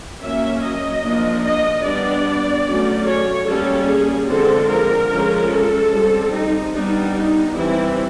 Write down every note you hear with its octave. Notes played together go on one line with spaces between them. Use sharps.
F#3 A#3 C#4 E5
D#5
F3 A#3 D4
D#5
G3 B3 D4 D5
F#3 A3 C#4
C#5
G3 A#3 C#4 A4
G#4
D3 F3 G#3 C4 A4
A#4
F3 G#3 C#4
A4
G3 C4
D#4
G3 B3 D4 D#4
D#4
E3 G3 C4 E4